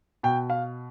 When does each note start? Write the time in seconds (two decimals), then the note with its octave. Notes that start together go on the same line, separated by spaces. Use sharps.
0.23 B2 G5
0.50 F5